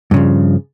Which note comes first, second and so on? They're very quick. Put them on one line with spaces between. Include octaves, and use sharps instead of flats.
G2 C#3 F3